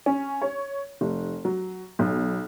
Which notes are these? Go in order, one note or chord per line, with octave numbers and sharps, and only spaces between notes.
C#4
C#5
F1
F#3
B1